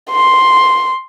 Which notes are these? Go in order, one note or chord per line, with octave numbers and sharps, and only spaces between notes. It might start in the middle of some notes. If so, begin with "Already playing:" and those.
C6